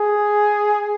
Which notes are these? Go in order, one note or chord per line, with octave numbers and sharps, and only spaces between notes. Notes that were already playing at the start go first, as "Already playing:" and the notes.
Already playing: G#4